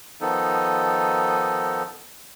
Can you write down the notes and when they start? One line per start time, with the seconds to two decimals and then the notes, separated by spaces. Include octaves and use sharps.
0.21 D#3 F3 B3 D#4 A4